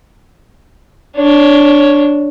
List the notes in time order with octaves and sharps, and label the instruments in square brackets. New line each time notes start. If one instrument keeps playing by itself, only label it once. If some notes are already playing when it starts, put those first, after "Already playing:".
[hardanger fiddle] D4 C#5